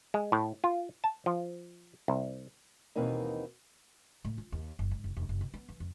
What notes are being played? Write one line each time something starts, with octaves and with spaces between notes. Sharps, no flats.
G#3
A2
F4
A5
F3
C2
D#2 B2 E3 A#3 C4 D#4
A2
F4
D#2
F#1
G#2
F#1
E1
F#1
B2
B3
E3
F2